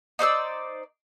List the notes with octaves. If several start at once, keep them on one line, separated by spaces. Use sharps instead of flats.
D#4 C5 D5 E6